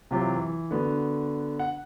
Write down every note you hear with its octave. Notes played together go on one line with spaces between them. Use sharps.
C3 E3 F#3 F4 G4
E3
D3 B3 F#4
F#5